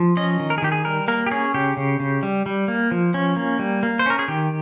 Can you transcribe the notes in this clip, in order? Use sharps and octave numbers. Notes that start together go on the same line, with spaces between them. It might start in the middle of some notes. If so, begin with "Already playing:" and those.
Already playing: F3
C#4 D#5
D#3
A#4
G#4
D#3 G4
G#4
G3 A#4
A#3 A#4
G4
C#4 G#4
C#3 G4
C#3
C#3
G3
G3
A#3
F3
C#4
A#3
G3
A#3
C5
C#4 A#4
G#4
D#3 G4